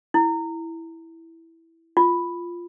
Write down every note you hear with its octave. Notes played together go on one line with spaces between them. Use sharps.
E4
F4